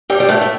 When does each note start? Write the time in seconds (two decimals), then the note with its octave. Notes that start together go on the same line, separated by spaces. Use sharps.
0.10 G2 G3
0.20 G3
0.29 A2 A3
0.41 A3